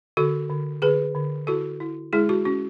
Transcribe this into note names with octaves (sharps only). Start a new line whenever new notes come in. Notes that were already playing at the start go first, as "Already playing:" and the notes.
D3 F#4 A4
D3
D3 G#4 B4
D3
E4 F#4 A4
E4
G#3 E4 G#4
F#4
C#4 F#4